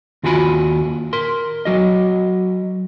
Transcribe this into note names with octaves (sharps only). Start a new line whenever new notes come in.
D#2 F4 F#4 G#5 B5
A#4 C6
F#3 F#4 D#5